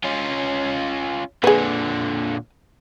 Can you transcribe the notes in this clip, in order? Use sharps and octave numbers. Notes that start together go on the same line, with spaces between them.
C#4 F4
A#2 D3 G#4 B4